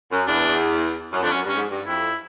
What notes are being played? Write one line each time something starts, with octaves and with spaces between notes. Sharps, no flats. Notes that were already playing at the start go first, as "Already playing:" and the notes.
F#2
E2 D4
F#2
F2 D4
F#2 C#4
G2
C#4
G#2
G2
F2 E4